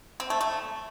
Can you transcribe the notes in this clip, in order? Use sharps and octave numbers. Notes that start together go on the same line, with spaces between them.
C4
A3
A3